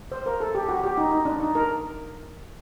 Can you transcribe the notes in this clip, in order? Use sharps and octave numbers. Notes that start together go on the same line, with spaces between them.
C5
A#4
A4
G4
F#4
G4
D#4
D#4
D4
D#4
A#4